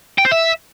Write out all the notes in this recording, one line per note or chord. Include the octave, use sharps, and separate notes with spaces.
G5
C5
E5